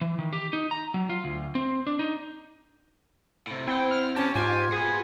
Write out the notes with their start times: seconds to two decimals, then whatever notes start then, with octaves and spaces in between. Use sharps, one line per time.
0.01 E3
0.19 D#3
0.33 G4
0.53 D#4
0.71 A#5
0.94 F#3
1.09 F4
1.24 D2
1.55 C4
1.87 D4
1.99 D#4
3.47 A2 C3
3.68 C4 E4 F#5 G5
3.91 F6
4.16 B3 C#4 G4 A5
4.35 G#2 F4 G4 G#5
4.72 F#4 G#4 B4